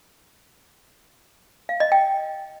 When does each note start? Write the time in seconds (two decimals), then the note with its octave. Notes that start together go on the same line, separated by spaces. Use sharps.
1.69 F5
1.80 D#5
1.92 G5